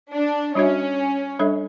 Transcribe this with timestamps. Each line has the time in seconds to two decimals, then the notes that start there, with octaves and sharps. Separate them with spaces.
0.13 D4
0.55 G3 C#4 D4 F#4 C#5 E5
1.39 G3 D4 A4 C#5 E5